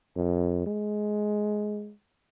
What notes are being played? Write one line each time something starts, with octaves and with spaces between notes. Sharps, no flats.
F2
G#3